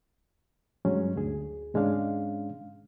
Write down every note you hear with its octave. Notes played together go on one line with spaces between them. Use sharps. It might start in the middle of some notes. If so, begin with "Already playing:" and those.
G2 F#3 G#3 C#4
D2 G#4
G#2 G#3 C#4 D4 F5